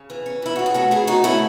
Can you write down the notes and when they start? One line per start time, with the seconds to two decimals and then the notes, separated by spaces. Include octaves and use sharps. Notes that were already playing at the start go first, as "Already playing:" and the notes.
Already playing: C#3
0.10 E3
0.26 C#4
0.42 E3 E4
0.56 C#3 F#4
0.66 G#4
0.74 A3 F#4 A4
0.91 A3 E4 G#4
1.07 C#3 D#4 F#4
1.24 A3 C#4 E4